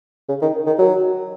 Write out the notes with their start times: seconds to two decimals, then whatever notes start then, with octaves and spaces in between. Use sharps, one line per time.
0.29 C#3
0.42 D#3
0.67 D#3
0.79 F#3